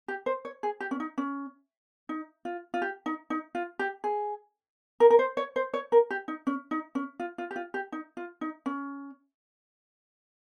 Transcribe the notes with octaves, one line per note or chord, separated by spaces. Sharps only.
G4
C5
C#5
G#4
G4
C#4
D#4
C#4
D#4
F4
F4
G4
D#4
D#4
F4
G4
G#4
A#4
A#4
C5
C#5
C5
C#5
A#4
G4
D#4
C#4
D#4
C#4
F4
F4
G4
F4
G4
D#4
F4
D#4
C#4